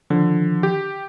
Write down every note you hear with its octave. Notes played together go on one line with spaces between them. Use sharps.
D3 D#3 F3
G4